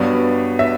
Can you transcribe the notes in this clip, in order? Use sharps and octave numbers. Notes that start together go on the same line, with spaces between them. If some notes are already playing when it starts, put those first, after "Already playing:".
Already playing: G2 F#3 B3 D5
E5